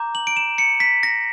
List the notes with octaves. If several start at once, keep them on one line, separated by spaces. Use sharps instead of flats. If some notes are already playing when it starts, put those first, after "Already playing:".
Already playing: A#5 D6 G6
F#7
D7
E7
C#7
B6
A#6